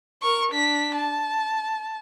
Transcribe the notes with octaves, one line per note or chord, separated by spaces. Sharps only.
A#4 C#6
D4 B6
A5